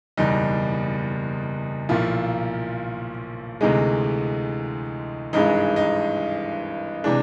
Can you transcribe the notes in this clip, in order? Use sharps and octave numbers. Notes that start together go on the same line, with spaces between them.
F#1 E2 B2 G3 D#4
B1 A#2 F3 E4
D2 C3 E3 G#3 D#4
G#1 G2 E3 G#3 D#4
D#4
C3 E3 G#3 D4